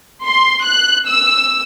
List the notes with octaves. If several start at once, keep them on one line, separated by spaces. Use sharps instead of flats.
C6
F#6
E6